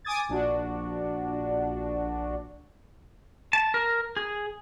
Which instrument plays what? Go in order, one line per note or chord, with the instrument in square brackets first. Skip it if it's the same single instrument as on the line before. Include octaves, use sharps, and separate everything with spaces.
[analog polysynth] G#5 D6 D#6 G#6 A6
A#1 D4 F#4
[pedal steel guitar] A5
A#4
G#4